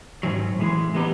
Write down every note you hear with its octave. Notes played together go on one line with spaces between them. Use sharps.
G#2 D#3 F#3
A2 E3 G#3
E3 G#3 B3 D#4 G4